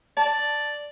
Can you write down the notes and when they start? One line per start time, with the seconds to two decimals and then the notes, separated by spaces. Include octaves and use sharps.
0.17 D5 A5